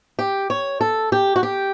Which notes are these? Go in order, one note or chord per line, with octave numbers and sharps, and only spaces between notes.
G4
C#5
A4
G4
F#4
G4